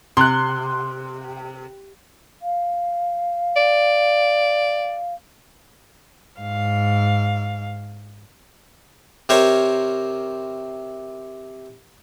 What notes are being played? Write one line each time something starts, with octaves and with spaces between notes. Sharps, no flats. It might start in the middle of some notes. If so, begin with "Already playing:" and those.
C3 C6 F#6
F5
D5
G#2 F5
C3 A#4 C5 C#5